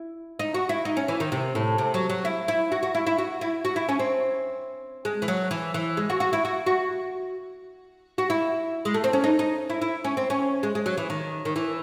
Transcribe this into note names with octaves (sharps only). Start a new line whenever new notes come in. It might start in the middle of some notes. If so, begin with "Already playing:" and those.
Already playing: E4
D#4
F#4
E4
D#4
C#4
E3
D#3
C3
A2
C3
F#3
F#3
E4
E4
F#4
F#4
E4
E4
F#4
E4
F#4
E4
C#4
C4
G#3
E3
F#3
E3
E3
G#3
F#4
F#4
E4
F#4
F#4
F#4
E4
G#3
A3
C4
C#4
D#4
D#4
E4
E4
C#4
C4
C#4
G#3
G#3
F#3
E3
D#3
D#3
E3